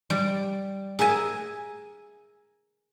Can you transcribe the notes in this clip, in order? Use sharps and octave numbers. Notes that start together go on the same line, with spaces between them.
G3
G#4 A#4 E5 G#5